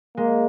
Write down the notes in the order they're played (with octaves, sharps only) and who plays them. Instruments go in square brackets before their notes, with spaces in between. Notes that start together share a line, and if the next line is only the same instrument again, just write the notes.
[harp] G#3 [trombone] A#3